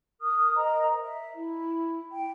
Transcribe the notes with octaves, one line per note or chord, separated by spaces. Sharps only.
A#4 D#6 F6
A#4 C5 D#5 A#5
E5
E4
G5